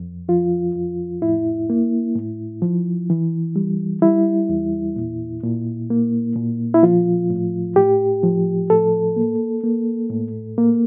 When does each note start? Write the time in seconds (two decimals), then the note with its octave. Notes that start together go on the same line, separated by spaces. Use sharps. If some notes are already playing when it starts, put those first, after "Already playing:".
Already playing: F2
0.28 F3 F4
0.75 F2
1.22 A2 E4
1.70 A#3
2.15 A2
2.62 F3
3.10 E3
3.56 G3
4.02 G3 E4
4.49 E2
4.96 A#2
5.43 A#2
5.90 A#3
6.36 A#2
6.74 E4
6.83 F3 F4
7.30 A2
7.76 A2 G4
8.23 F3
8.70 A2 A4
9.16 A#3
9.63 A#3
10.10 A2
10.58 A#3